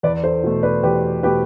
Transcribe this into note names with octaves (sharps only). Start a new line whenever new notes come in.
E2 B4 D5
A4 C5
B2 A3
B4 D5
E2 G4 B4
B2 A3 G4 B4